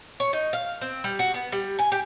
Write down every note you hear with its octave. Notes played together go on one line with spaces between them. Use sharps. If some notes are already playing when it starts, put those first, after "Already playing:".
C#5
D#4
F5
C4
G3
F#4
B3
G3
G#5
G4